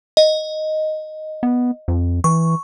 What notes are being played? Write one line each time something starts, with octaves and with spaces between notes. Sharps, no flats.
D#5
B3
F2
E3 C#6